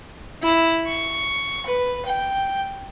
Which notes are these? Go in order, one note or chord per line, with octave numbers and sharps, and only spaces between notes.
E4
C#6
B4
G5